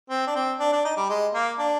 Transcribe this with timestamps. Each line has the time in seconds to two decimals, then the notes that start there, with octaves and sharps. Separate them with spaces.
0.10 C4
0.27 D4
0.35 C4
0.60 D4
0.72 D4
0.85 D#4
0.97 G3
1.09 G#3
1.34 A#3
1.59 D4